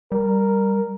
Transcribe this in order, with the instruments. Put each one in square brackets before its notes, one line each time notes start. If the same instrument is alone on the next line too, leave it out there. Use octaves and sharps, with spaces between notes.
[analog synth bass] G3 [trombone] A#4